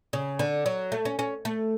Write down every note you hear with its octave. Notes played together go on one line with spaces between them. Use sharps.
C#3
D3
F#3
A3
C#4
C#4
A3